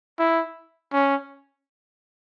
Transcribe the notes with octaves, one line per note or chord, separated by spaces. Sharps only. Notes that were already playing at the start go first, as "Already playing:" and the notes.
E4
C#4